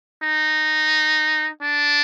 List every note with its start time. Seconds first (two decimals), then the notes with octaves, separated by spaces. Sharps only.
0.23 D#4
1.62 D4